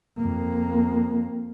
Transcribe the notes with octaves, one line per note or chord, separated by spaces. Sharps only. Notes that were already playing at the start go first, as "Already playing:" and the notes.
F2 A#3